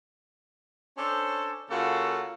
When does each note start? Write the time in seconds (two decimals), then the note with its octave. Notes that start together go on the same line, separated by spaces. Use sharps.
0.97 C#4 D4 A4 C5
1.70 C#3 A#3 F4 F#4 A4